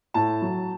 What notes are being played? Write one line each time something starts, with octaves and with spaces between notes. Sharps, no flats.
A2 A5
F#3